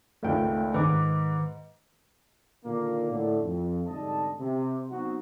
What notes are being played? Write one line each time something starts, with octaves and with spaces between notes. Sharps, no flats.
G#1 C#2 G#2 A3 G5
G#2 D#3 B4 D6
A#2 D3 D#3 A#3
A2 D3
F2
C2 G#2 D3 D#5 A5
C3
F#3 B3 C4 D#4 F#4